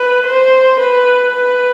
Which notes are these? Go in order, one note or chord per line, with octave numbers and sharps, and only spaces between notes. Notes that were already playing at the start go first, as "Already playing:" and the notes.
Already playing: B4
C5
B4
B4